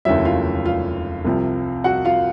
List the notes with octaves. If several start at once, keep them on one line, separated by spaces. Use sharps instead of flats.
F1 D#2 C#3 F#3 E4 E5
F4 F5
F4 F5
C2 C3 F3
F#4 F#5
F4 F5